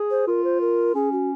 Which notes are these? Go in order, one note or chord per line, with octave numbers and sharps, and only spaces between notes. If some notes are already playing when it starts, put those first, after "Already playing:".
Already playing: G#4
C5
F4 A#4
C5
A#4
C#4 G#4
F#4